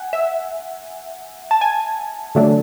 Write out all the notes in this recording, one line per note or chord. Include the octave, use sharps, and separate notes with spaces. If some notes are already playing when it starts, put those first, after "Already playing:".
Already playing: F#5 G#5
E5
A5
G#5
D3 F#3 A3 D4